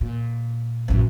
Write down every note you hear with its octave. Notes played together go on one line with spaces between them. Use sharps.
A#2
A1 F#2